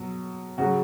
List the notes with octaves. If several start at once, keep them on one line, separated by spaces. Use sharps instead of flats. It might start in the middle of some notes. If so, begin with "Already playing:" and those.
Already playing: B2 F#3
C#3 F#3 F#4